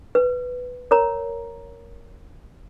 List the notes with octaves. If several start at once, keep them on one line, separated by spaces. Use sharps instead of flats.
B4
A#4 C#5 A#5